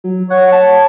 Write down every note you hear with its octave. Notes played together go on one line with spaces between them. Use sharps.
F#3
C#5 F#5
A5